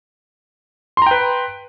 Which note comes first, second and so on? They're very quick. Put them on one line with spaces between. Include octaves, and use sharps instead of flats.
C6 A#5 G5 B4